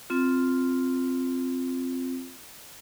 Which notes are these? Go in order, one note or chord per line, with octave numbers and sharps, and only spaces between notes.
C4 F4